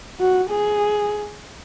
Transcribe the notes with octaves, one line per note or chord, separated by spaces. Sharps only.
F#4
G#4